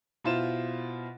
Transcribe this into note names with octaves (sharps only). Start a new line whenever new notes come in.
B2 E4 F4 C5 E7